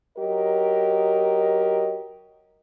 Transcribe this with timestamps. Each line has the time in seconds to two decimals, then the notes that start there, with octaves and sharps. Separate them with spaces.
0.18 F#3 G4 A#4 D#5